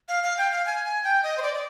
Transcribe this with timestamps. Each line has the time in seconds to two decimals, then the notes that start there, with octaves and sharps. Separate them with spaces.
0.08 F5
0.23 F5
0.38 G5
0.51 F5
0.66 G#5
0.85 G#5
1.04 G5
1.23 D#5
1.38 C5
1.42 D5
1.54 D5